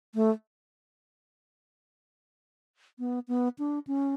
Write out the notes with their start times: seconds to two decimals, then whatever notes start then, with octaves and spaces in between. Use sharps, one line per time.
0.15 A3
2.99 B3
3.28 B3
3.59 D4
3.87 C#4